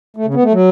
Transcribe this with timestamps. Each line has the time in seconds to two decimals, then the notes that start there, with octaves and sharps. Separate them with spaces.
0.17 A3
0.25 C#3
0.34 B3
0.43 A3
0.52 F#3